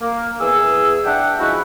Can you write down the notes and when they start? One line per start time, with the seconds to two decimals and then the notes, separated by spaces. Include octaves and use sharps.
0.01 A#3
0.41 E2 G#4 E6
1.05 D4 E5 F#5 G5
1.39 F3 G#3 C#4 E4 F#4